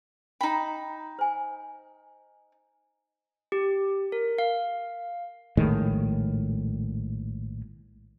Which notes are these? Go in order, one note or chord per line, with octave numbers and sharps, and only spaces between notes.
D#4 G5 A#5 B5
C5 G#5
G4
A#4
F5
A#1 A2 D#3 G#3